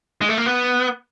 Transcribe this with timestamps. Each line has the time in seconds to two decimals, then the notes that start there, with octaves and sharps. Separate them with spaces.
0.21 G#3
0.29 A3
0.38 A#3
0.46 B3